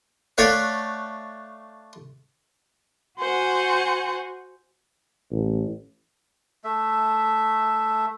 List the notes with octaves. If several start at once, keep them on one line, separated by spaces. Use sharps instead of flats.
A3 D4 C#5 F5 F#5
F#4 C5 F#5 G#5
A1
A3 E5